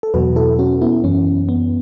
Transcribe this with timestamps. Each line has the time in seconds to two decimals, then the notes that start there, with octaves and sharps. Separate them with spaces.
0.03 A4
0.14 E2 B2 F#3 F#4 B4
0.36 E4 A4
0.59 C#4 F#4
0.81 B3 E4
1.04 F#2 E3 C#4
1.49 B3